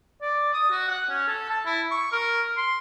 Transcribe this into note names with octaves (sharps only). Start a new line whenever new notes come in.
D5
D#6
F#4
F#5
C#4
A4
A5
E4
C#6
A#4
C6